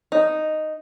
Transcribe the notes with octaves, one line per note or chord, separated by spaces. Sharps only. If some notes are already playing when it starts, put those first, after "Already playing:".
D#4